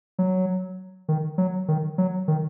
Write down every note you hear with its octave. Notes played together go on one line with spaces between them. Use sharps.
F#3
D#3
F#3
D#3
F#3
D#3